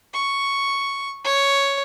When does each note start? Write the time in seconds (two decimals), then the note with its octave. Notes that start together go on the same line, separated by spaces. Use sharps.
0.14 C#6
1.24 C#5